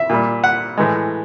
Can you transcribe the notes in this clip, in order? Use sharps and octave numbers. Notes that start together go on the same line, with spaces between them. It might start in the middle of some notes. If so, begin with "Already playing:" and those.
Already playing: E5
A#2 G3
F#5
A2 E3 G#3